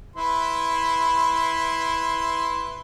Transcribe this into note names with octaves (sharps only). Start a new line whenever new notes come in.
E4 B4 C6